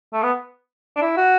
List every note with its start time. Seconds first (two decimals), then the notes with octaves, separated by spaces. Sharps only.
0.13 A3
0.23 B3
0.97 D4
1.02 E4
1.17 F#4